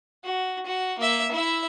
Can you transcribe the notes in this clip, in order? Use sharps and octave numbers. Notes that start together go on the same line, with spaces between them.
F#4
F#4
A#3 E5
E4 E5